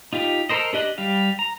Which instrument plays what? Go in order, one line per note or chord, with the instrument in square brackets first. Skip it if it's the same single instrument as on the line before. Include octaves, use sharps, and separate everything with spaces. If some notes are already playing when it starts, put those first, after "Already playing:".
[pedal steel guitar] D#4 F4 G4
A4 A#4 C5 D#5
D4 G4 D#5 F#6
G3 G4 F5
A#5